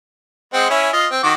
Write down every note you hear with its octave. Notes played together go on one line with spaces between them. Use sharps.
G#3 C4 F#5
C#4 E4 G#5
F4 D#5
C4
D#3 F#4 D6